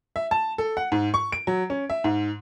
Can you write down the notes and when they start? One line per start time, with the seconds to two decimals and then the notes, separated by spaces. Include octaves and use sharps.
0.16 E5
0.31 A5
0.58 A4
0.77 F#5
0.92 G#2
1.14 C#6
1.32 D7
1.47 F#3
1.70 C#4
1.90 E5
2.04 G#2